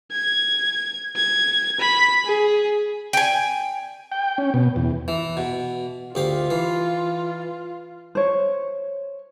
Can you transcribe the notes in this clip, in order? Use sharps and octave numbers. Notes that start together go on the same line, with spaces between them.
G#6
G#6
B5
G#4
G5 G#5
G5
C#4
B2
E2
E3
B2
D2 F4 G4 F5
E3
C5 C#5